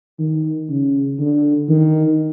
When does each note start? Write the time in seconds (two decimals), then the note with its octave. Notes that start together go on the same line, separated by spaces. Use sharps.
0.19 D#3
0.69 C#3
1.19 D3
1.69 D#3